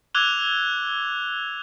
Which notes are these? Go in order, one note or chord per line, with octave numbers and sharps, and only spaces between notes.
D6 E6 F#6 G#6 F7 G7